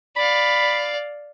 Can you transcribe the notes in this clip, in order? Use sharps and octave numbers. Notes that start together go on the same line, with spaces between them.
D5 F5 B5